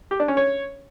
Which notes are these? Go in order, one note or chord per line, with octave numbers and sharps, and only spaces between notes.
G4
D4
C#4
C#5